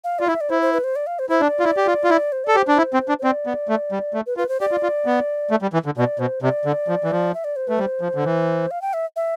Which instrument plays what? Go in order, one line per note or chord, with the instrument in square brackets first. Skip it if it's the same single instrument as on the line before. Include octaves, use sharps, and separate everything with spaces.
[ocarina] F5
[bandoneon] F4 [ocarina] D5
[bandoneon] E4 [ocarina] E5
[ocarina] D5
[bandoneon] E4 [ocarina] C5
[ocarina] C5
B4
C5
D5
F5
C5
[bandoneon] E4 [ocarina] C5
[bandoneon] D4 [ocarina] D5
[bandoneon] F4
E4
G4
F4
F4
E4
[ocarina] C5
[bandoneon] A4 [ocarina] D5
[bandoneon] G4 [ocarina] C5
[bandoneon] D4
E4
C4
D4
[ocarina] C5
[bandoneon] C4 [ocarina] D5
[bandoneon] B3
A3
G3
A3
[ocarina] B4
[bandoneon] F4 [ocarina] B4
[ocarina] C5
[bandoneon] G4 [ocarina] D5
[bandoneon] F4
F4
B3
A3
G3
E3
D3
[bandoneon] B2 [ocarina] D5
[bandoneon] B2 [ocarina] C5
[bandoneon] C3 [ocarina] D5
[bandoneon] D3
F3
E3
F3
[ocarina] E5
D5
C5
[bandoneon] A3 [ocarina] B4
[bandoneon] G3 [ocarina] C5
[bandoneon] F3
D3
E3
[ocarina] F5
G5
E5
E5